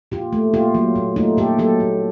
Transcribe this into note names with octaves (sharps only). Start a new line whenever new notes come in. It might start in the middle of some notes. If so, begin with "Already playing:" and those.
A#2 F4 G4
A3
A#2 F4 G4
F#3
A#2
A3 D#4 F4
A#2 G4 A4
F#3 G4 A4
A#2